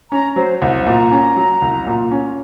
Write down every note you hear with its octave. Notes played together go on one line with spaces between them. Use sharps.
C#4 A#5
F#3 C5
C2 F#5
A#2 A#5
C#4
F#3
C2
A#2
C#4